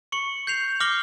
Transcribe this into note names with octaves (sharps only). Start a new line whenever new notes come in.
C#6 C#7 F#7
G6 C7 F7
D6 F6 A#6 C7 F#7 G7